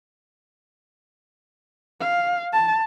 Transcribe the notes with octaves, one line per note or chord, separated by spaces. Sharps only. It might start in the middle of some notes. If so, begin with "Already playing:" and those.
F5
A5